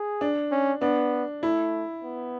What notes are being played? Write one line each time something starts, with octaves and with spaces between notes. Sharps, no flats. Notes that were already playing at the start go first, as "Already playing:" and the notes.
Already playing: G#4
D4
C#4
B3 D4
A3 E4
B3